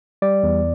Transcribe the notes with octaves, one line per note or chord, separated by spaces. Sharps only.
G3 D5
E2